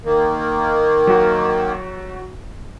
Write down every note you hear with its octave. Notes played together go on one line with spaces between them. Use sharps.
D#3 A#3
F#3 F#4